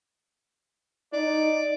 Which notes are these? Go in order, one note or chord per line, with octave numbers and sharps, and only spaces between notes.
D#4 D5